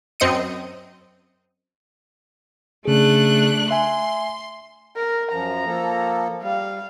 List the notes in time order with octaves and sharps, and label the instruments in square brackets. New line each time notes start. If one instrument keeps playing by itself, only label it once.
[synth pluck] F#2 C4 D#5 C#7 D#7
[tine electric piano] C#3 G#4 [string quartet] A3 D4 F#6
[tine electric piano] E5 G#5 [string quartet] C6
[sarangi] A#4
[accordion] F#2 F3 [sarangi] A#5
[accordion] F3 A#3 A4
[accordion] G3 [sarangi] F5